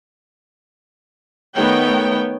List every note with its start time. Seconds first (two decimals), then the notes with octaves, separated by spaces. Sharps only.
1.55 D#3 A3 B3 C#5 G5